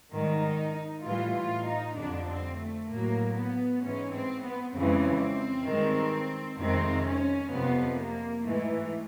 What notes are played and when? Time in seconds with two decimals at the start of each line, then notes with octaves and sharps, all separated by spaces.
0.13 G#2 D#3 G3
0.43 D#4
1.04 A2 E3 G3 F4
1.36 F4
1.67 D#4
1.97 F2 D3 G3 D4
2.28 C4
2.58 A3
2.89 A2 F#3 A#3
3.35 B3
3.82 G#2 E3 G#3 C#4
4.13 C4
4.43 B3
4.74 F2 C#3 E3 G#3 C4
5.66 G2 D#3 G#3
6.59 F2 C3 D#3 G#3 C4
7.05 C#4
7.51 F2 C3 F3 B3
7.98 A#3
8.43 G#2 E3 G#3 A3